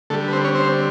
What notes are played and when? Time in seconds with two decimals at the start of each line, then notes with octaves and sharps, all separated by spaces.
0.10 D3 G3 A3 A4
0.28 B4
0.33 C4 C5
0.44 C#4 C#5
0.55 C4 C5